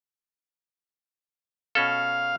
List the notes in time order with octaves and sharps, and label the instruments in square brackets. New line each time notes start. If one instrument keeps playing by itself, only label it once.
[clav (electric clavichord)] B2 C#4 A4 [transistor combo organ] F5